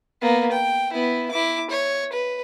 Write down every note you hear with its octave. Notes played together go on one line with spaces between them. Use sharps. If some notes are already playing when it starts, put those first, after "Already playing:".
A#3 B3
G5
B3 E4
E4 D6
C#5
B4